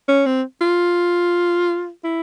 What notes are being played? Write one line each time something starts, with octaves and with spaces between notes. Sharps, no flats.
C#4
C4
F4
E4